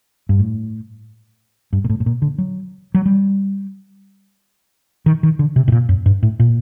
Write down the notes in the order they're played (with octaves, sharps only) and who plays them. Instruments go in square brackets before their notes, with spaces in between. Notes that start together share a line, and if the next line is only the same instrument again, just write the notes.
[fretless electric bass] G2
A2
G2
A#2
A2
A2
A#2
D3
F#3
F#3
G3
D#3
D#3
D3
C3
A2
A#2
F#2
G2
A2
A#2